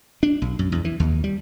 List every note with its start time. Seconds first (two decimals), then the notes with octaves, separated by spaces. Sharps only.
0.23 D4
0.42 B1
0.59 F#2
0.72 E2
0.85 E3
1.00 D#2
1.24 G3